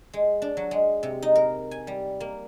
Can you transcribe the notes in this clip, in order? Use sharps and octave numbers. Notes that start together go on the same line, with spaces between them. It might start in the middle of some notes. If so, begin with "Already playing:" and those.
G#3
D4
F#3
G#3
C3
D#4
A#4
G#5
G3
A#3